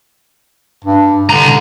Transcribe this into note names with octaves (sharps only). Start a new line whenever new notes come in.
G2
C2 D3 A#5